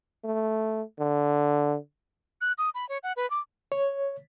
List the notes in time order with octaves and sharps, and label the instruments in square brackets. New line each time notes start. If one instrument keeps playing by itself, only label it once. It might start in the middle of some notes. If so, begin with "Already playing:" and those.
[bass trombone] A3
D3
[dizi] F#6
D#6
B5
C#5
F#5
B4
D6
[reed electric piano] C#5